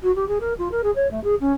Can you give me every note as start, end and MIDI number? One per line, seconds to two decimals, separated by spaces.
0.03 0.14 66
0.15 0.27 67
0.28 0.38 68
0.40 0.53 70
0.58 0.68 65
0.72 0.81 70
0.83 0.91 68
0.95 1.09 73
1.11 1.22 57
1.24 1.35 68
1.41 1.53 61